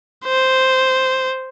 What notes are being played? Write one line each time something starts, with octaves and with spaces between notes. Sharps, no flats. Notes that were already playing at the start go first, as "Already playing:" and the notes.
C5